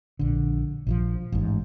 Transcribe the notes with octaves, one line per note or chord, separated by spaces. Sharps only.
A#1 D3
A#1 E3 F3
A1 G#2